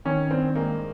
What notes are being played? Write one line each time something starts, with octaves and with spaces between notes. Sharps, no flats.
D#3 C#4
G2 C4
G#3 A#3